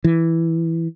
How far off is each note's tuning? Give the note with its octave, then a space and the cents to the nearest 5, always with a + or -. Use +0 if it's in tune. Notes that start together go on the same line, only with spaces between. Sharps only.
E3 +0